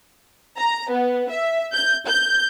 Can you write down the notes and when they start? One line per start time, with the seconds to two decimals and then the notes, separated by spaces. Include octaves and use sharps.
0.58 A#5
0.91 B3
1.30 E5
1.73 G6
2.07 G6